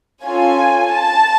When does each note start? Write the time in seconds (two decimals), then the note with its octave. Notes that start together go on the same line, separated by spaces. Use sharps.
0.23 C#4 F4 A4 G#5
0.92 A5